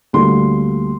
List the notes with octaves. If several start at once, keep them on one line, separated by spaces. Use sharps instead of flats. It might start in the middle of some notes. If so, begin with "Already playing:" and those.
D2 D3 G3 A#3 C6